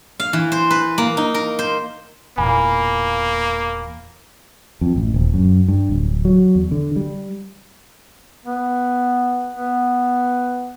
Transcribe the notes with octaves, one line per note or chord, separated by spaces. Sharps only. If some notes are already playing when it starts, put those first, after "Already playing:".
F5
E3
C5
B4
A#3
D#4
A#4
C5
E1 E2 A#2 A#3 G#5 B5
F2
A1
D#1
F#2
G2
D1
F#3
E2
D3
G3
B3
B3